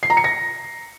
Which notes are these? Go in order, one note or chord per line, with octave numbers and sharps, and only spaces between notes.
C7
A#5
C#7
A#6